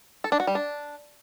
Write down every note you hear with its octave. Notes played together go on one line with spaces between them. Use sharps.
A4
D4
F#4
G3
D4